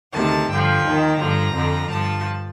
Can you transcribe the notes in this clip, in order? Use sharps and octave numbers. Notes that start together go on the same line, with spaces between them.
D2 C3 D#3 A5
G2 D3 F3 G5
D#2 D#3
G2 D3 F3 A#5
F2 D3 F3
G2 F3 A5